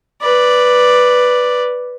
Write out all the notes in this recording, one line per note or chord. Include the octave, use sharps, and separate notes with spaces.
B4 D5